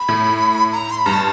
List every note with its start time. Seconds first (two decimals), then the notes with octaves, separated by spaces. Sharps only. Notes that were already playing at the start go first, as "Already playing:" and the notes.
Already playing: B5
0.09 A2
0.72 A#5
0.91 C6
0.98 B5
1.06 G2 A#5
1.14 A5